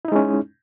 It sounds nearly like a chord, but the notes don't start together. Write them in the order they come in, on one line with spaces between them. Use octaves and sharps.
E4 D#4 G#3 C#4